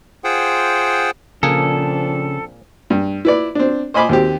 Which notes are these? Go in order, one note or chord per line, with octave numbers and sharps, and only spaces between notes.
F4 G#4 C5 F#5 G5
A#2 C#3 F3 A#3 C4 D4 G#4 A4
G2
E4 B4 D5
C4 D4
C5 D#5 G#5 B5 C6 D6
D#2 C4 G4